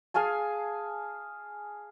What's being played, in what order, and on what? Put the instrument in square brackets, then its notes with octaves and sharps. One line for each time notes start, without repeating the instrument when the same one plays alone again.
[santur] G#4 F5 G#5 A5